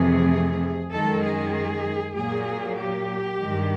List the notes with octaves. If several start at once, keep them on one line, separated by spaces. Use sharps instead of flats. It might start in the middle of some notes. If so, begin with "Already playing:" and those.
Already playing: F2 C3 E3 A3 G#4
F#2 D#3 G#3 A4
G#4
A#2 F#3 A#3 G#4
G4
G2 D#3 G#3